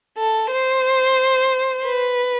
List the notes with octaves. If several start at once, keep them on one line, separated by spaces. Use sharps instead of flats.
A4
C5
B4